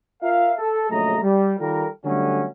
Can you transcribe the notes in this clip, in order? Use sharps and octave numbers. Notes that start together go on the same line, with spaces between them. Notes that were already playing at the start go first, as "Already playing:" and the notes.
F4 A#4 E5 F5
A4
A#1 C#3 F#3 A3 D#5 A#5
G3
D#3 G3 F4 A4 A#4
D3 F#3 G3 A3 C#4